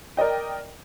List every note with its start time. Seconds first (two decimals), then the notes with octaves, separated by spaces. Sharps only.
0.17 A#4 D5 D#5 G5